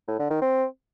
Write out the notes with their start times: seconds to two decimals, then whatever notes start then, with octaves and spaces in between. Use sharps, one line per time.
0.08 A2
0.19 D3
0.30 D#3
0.42 C4